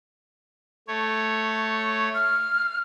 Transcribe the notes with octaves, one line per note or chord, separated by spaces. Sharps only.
A3 C#5
F6